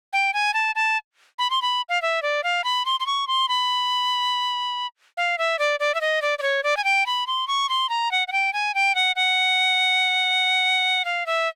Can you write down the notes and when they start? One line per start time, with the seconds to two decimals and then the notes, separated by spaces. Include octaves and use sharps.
0.13 G5
0.34 G#5
0.54 A5
0.75 A5
1.39 B5
1.50 C6
1.62 B5
1.89 F5
2.02 E5
2.22 D5
2.44 F5
2.64 B5
2.85 C6
3.00 C6
3.06 C#6
3.27 C6
3.49 B5
5.17 F5
5.38 E5
5.59 D5
5.80 D5
5.95 E5
6.01 D#5
6.22 D5
6.39 D5
6.42 C#5
6.63 D5
6.77 G#5
6.84 G5
7.06 B5
7.27 C6
7.48 C#6
7.69 C6
7.89 A#5
8.11 F#5
8.28 F#5
8.32 G5
8.53 G#5
8.75 G5
8.95 F#5
9.16 F#5
11.05 F5
11.26 E5